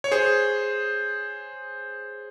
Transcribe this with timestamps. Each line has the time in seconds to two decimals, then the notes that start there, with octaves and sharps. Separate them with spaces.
0.04 C#5
0.12 G#4 C5